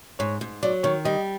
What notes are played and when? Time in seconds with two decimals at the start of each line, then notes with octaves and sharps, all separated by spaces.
0.19 G#2 C#5
0.41 G#2
0.63 F#3 D5
0.83 D#3 C#5
1.05 G3 D#5